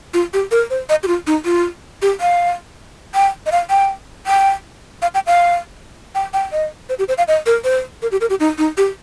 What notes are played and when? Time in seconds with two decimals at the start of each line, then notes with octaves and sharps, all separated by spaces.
0.14 F4
0.33 G4
0.51 A#4
0.70 C5
0.89 D#5
1.03 G4
1.07 F4
1.27 D#4
1.45 F4
2.02 G4
2.21 F5
3.15 G5
3.46 D#5
3.52 F5
3.70 G5
4.27 G5
5.02 F5
5.14 G5
5.27 F5
6.15 G5
6.33 G5
6.52 D#5
6.89 C5
6.99 G4
7.08 C5
7.18 F5
7.28 D#5
7.46 A#4
7.64 C5
8.02 A#4
8.12 G4
8.21 A#4
8.30 G4
8.40 D#4
8.58 D#4
8.77 G4